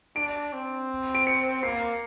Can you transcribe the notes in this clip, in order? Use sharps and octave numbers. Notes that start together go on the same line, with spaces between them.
D4 D7
C4
D7
C#7
A#3 C7